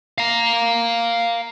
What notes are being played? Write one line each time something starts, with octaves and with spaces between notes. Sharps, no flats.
F5 A#5